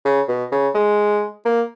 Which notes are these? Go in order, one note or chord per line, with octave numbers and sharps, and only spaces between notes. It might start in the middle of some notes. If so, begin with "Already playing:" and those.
C#3
B2
C#3
G#3
A#3